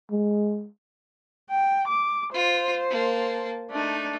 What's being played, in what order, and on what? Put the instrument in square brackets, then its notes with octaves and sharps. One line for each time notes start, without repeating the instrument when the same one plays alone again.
[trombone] G#3
[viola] G5
D6
[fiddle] F4 [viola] C5
[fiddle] A#3 A5
[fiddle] A3 D#4 [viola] D4